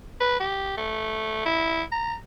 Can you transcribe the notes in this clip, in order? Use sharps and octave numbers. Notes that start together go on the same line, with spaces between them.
B4
G4
A3
E4
A#5